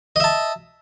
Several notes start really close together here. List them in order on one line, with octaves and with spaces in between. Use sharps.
D#5 E5 A5